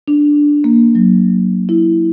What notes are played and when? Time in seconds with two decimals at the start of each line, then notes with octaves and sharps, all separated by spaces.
0.08 D4
0.64 A#3
0.95 F#3
1.69 E4